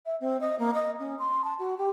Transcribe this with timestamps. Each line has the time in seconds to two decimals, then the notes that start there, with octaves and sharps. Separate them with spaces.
0.05 E5
0.20 C4
0.40 D#5
0.58 A#3
0.74 D#5
0.99 C#4
1.18 C6
1.44 A5
1.58 F#4
1.77 G4